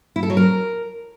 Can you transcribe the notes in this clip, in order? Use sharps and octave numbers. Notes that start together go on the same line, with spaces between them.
E4
A4
F#3
A#4